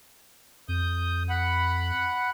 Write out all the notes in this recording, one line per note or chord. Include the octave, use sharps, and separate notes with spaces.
F2 D#6 G6
F#5 B5 F#6